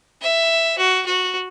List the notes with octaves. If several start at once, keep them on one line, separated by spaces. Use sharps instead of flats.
E5
F#4
F#4